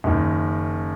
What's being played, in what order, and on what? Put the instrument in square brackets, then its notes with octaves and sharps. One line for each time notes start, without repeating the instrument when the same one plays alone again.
[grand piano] F#1 F#2 D#3